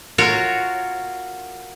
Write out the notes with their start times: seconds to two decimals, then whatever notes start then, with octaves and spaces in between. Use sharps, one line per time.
0.18 F4 F#4 A#4 C#5